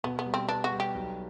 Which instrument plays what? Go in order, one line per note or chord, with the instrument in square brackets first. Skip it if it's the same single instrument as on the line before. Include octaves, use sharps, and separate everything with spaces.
[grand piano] B2 [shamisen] B3
[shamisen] B3
[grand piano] G3
[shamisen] C4
[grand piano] B3 [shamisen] D4
[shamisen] F#4
[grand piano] G3
[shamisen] G4
[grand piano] B1